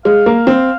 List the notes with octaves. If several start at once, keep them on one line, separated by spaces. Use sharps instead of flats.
G#3 F5
A#3
C4